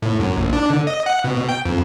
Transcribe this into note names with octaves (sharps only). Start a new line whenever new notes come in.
A2
F#2
A#1
D4
D3
D#5
F#5
B2
G5
F2